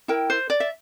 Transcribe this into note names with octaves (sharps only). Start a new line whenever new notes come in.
E4 A#4 G5
C5
D5
E5